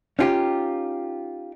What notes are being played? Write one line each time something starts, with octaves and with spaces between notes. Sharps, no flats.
C#4 D#4 F4 G4